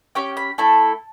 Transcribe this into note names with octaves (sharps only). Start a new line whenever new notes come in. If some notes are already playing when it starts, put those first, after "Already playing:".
C#4 G4 G5
B5
A3 E4 A4 A5